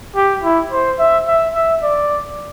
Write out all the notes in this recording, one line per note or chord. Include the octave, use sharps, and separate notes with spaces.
G4
E4
C5
E5
E5
E5
D5